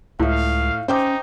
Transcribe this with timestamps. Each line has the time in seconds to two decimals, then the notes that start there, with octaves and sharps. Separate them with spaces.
0.20 C#2 A2 E5 F5
0.88 C#4 D#4 C5 G5 D6